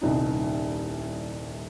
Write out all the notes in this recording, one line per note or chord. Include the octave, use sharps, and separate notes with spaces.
D#1 C2 D#4